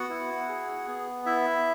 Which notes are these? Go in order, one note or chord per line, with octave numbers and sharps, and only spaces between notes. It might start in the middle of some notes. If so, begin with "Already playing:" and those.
Already playing: B3 F#4 F#5
E4
G#4
B3
E4 E5